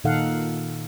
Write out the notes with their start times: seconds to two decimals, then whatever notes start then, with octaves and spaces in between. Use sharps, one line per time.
0.04 A#2 D#3 D#4 A4 F5 F#5